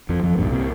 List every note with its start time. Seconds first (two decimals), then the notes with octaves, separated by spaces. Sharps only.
0.09 F2 F3
0.23 F2 F3
0.37 C2 G2 A#2 G3
0.52 C3 C4